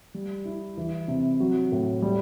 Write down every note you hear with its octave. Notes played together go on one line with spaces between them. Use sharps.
G3
E4
E3
C3
F#3
A2
G3